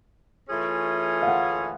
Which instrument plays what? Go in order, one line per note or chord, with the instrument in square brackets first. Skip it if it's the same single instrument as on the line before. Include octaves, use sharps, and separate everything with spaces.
[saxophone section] E3 A3 C#4 F4 G#4
[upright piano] F5
F#5